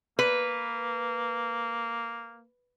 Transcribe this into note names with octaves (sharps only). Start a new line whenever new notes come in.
A#3 B4